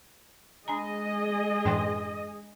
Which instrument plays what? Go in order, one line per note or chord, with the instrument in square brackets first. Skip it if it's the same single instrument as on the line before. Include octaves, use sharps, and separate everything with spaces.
[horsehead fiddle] G#3 G#4 [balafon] D4 G#5 A#5 [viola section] D#5
[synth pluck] F#2 A2 E3 [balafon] D4 G5 C6